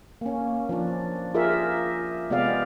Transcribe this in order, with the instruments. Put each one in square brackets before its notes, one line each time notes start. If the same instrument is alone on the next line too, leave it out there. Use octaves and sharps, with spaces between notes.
[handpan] A#3 C#4
F3 D4
F4 G4 G#4 A#4 E5
C3 G#3 B3 G4 D5 F5